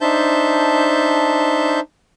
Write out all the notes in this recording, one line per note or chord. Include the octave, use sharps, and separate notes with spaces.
D4 D#4 C5 E5 A5 G6